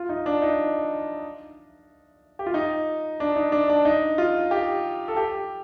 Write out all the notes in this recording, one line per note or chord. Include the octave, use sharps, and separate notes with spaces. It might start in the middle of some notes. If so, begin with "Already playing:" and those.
Already playing: F4
D#4
D4
D#4
G4
F4
D#4
D4
D#4
D4
D4
D#4
F4
G4
A4
G4